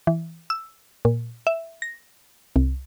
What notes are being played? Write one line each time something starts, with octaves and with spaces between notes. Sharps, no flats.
E3
E6
A#2
E5
A#6
C2